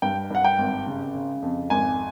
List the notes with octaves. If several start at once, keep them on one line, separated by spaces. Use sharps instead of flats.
G2 G5
G2 F#5
G5
G#1
C#3
C#3
F2
G#1 G#5